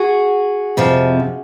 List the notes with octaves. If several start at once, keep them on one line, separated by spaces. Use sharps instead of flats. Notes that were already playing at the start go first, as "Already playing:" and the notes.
Already playing: F#4 G#4
F2 C3 F3